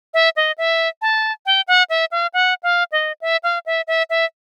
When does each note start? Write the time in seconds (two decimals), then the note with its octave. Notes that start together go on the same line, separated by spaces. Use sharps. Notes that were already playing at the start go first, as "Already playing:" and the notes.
0.14 E5
0.36 D#5
0.58 E5
1.02 A5
1.46 G5
1.68 F#5
1.90 E5
2.11 F5
2.34 F#5
2.63 F5
2.92 D#5
3.21 E5
3.43 F5
3.66 E5
3.87 E5
4.10 E5